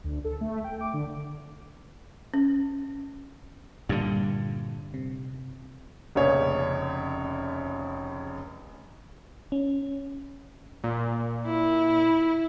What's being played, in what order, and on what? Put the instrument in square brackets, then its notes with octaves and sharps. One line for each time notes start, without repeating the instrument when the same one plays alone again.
[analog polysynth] D2
A4
A3
G5
D6
D3
[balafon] C#4
[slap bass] G2 D3 [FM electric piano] A#2 G3
[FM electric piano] C3
[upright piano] F1 A#1 C#3 C#5
[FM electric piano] C#4
[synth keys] A#2
[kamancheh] E4